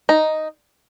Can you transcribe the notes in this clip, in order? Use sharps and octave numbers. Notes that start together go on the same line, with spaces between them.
D#4